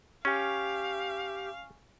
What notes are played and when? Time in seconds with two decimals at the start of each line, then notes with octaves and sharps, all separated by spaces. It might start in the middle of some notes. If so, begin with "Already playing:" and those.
0.25 C#4 G4 F5 G#5 C#6